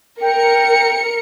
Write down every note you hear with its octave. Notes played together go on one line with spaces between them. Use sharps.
A#4 G5 C#7